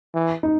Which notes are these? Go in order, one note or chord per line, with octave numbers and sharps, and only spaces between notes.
E3
D#4